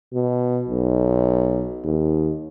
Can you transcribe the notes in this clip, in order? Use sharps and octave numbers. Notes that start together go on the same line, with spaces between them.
B2
B1
D#2